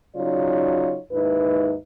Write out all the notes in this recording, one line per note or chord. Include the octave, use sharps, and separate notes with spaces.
C#3 F#3 D#4 F4 C#5 D5
D#2 G#2 D#4 E4 B4